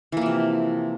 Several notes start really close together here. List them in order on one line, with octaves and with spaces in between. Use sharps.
E3 A#3 F3 C3